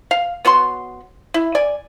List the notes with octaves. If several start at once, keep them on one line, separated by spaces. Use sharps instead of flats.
F5
B3 F#4 C#5 C6
E4
D5 G#5